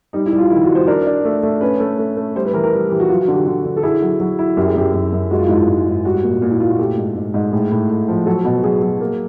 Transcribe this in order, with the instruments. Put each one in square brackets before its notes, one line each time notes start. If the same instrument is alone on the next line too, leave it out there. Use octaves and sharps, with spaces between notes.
[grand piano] G3 [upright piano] D#4
[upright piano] E4
[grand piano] G3
[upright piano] F4
[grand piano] D#3 [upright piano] E4
[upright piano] F#4
[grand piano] G3
[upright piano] C5
[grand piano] D4 [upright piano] A#4
[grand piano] D4
A3
A3
[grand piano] C#4 [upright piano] B4
[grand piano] A3
A3
A3
[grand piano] G3 [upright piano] C5
[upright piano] B4
[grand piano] E3 [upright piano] A#4
[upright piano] A#4
[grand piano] G3
[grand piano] E3 [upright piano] G4
[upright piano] F#4
[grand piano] F#3 [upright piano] F4
[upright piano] F#4
[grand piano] D3
[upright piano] G4
[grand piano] D3
D3
[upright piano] A4
[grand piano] E4 [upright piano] G#4
[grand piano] F#3
F#3
E4
[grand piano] F#2 [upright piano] G4
[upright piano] G#4
[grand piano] F#2 [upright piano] G4
[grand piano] F#2
F#2
[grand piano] G#3 [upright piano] F#4
[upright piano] F4
[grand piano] G#2 [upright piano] E4
[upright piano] F4
[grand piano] G#2
G#2
[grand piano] G3 [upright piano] F#4
[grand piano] A#2
A#2
[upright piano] E4
[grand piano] A#2 [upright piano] F4
[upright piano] F#4
[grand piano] A3 [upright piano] G4
[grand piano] G#2
G#2
G#2
[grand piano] A2 [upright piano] G#4
[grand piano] A2
A2
F3
[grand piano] F#3 [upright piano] A4
[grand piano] B2
[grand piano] F#3 [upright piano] G#4
[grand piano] F#3
A#3